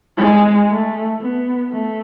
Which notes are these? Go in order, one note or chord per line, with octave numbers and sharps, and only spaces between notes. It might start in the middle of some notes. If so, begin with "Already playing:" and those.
G#3
A3
B3
A3